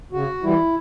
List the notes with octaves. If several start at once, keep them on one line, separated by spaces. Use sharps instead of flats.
C#3 F#4
E3 G3 E4